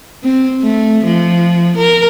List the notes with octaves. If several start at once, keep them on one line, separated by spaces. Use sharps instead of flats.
C4
A3
F3
A#4